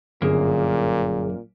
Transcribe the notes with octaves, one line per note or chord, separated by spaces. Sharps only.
G1 F#2 A#2 A#3 G#4